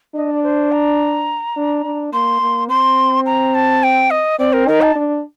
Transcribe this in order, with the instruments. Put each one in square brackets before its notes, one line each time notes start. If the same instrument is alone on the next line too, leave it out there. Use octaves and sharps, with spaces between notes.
[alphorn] D4 [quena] D#5
[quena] D5
C5
A#5
[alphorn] D4
D4
[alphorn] A#3 [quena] C6
[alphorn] A#3
[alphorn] C4 [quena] C6
[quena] A#5
A5
G5
D#5
[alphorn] C4 [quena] D5
[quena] A#4
[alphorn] D#4 [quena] A#4
[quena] A5
[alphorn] D4